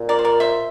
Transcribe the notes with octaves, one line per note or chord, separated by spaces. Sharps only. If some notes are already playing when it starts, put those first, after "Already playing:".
Already playing: A#2
A#4 D5
C5
A#4 D5
C5 E5